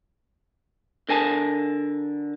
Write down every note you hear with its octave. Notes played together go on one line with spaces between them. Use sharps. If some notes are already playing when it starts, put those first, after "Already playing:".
D3 A#4 G#5 A5